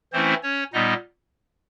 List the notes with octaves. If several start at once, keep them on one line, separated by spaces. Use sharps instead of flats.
E3 A3 C4 C#4 E4 C5
C#4 C#5
A#2 G3 B3 D#4 D#5